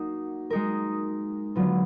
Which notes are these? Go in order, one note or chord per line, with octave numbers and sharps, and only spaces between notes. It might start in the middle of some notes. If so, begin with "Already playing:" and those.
Already playing: A#3 D#4 F#4
G#3 D#4 A#4
D3 F#3 B3 F4